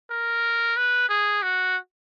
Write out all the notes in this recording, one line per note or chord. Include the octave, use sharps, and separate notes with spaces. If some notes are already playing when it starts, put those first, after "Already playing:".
A#4
B4
G#4
F#4